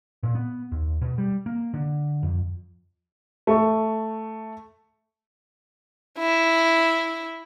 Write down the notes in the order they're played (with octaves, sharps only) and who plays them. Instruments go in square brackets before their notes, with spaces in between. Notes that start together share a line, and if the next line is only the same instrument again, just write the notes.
[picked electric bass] A#2
B3
D#2
B2
G3
A#3
D3
F2
[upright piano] A3 C#6
[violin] E4